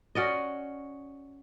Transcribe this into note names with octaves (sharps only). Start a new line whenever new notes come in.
C#4 F#4 D5 D#5